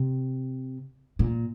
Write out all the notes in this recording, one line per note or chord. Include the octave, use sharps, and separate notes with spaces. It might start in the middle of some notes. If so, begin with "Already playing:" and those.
Already playing: C3
A#2